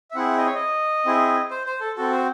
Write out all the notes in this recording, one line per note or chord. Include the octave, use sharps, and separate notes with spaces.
E5
C4 E4 G#4 F#5
D#5
C#5
D#5
C4 E4 G#4
C5
C5
A4
C4 F#4 A4
C5